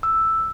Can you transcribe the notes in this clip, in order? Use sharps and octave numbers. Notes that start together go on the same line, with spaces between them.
E6